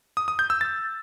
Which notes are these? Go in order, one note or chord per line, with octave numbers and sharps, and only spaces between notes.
D#6
D#6
G6
E6
A6